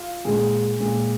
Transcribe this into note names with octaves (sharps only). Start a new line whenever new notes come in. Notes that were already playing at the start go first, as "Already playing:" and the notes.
Already playing: F4
A#2 G#3 G#4
A#2 G#3